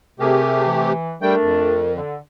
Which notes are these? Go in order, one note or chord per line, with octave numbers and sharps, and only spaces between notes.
C3 A3 G4 G#4 A#4
E3
G3 A3 D4 A#4 G5
F2
D3